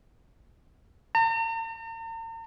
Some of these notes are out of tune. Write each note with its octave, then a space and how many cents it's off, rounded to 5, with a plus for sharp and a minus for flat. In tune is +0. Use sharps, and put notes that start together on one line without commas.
A#5 -45